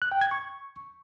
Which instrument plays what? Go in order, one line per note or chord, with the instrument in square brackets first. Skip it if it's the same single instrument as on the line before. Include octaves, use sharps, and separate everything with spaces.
[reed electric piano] F#6
G5
G#6
C#6